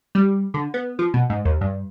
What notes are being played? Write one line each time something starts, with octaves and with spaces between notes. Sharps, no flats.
G3
D3
B3
F3
B2
G#2
D#2
G2